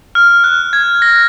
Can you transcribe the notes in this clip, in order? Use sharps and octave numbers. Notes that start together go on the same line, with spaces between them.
F6
F#6
G#6
A#6